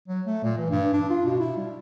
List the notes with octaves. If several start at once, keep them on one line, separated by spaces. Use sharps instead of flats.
F#3
A3
A#2
E3
G2
D4
F4
B2
E4
G3